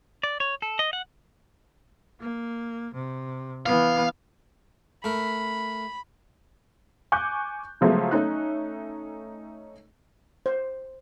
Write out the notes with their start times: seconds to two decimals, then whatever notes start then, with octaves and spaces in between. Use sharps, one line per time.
0.23 D5
0.40 C#5
0.62 A4
0.79 D#5
0.93 F#5
2.20 A#3
2.94 C3
3.66 E3 B3 F5
5.04 A3 A#4 B5
7.12 G#5 C#6 D6 F#6 G6
7.81 C#3 F3 F#3 G#3 A3 B3
8.11 A3 C#4 D#4 F#6
10.46 C5